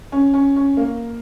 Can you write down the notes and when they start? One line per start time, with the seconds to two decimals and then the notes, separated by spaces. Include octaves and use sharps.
0.12 C#4
0.34 C#4
0.56 C#4
0.77 A#3